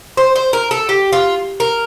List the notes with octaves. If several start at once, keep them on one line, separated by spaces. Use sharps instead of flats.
C5
C5
A#4
A4
G4
F4
A#4